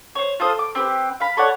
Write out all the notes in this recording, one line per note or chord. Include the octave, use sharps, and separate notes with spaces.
C5 C#5
F4 A4 C5 D#6
D6
C4 G4 B4
F5 B5
A4 C#5 D5 F#5